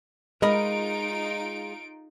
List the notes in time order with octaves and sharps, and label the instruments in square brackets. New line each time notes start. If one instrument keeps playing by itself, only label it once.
[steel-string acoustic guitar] G#3 [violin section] D#4 F4 D7 [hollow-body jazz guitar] A#4 D#5 B5